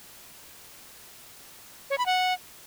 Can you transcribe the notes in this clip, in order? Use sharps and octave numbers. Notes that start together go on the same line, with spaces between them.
C#5
B5
F#5